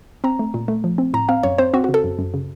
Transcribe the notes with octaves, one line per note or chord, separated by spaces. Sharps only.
C4 A#5
A3
A#2
A3
F3
C4
A2 A#5
C4 F5
F#2 C#5
C4 C5
C4 F#4
F#4
C#3
A4
F#2
F#2
C#3